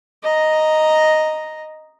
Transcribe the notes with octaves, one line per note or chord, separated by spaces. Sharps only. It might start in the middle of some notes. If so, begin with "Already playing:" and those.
D#5 A#5